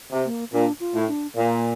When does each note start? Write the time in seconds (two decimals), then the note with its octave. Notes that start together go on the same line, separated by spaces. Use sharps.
0.12 C3
0.25 A#3
0.53 A#2 D4
0.80 F4
0.94 A2
1.08 D4
1.36 A#2 A#3